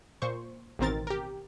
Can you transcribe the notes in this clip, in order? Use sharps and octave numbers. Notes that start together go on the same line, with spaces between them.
A#2 C5 C#6
A1 B2 D#3 C4 A#4 A6
G4 A#4